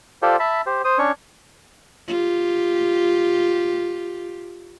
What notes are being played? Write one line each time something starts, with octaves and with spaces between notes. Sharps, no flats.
F4 G4 A4 C5 D5
E5 A5 B5
G4 C5
C5 D#6
C#4 D4 C#5
F4 G4